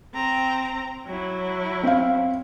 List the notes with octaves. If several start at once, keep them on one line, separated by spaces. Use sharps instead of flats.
C4 A#5
F#3 E4
C4 F5